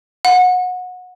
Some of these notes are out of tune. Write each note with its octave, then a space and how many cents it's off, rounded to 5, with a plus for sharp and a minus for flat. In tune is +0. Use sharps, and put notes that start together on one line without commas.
F#5 -25